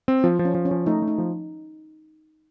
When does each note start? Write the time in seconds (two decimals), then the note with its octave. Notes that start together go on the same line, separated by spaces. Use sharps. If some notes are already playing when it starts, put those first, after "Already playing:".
0.08 C4
0.24 F3 F4
0.39 F3
0.45 C#4
0.55 F3
0.65 C#4
0.71 F3
0.86 A3 D#4
1.02 A3
1.08 D#4
1.18 F3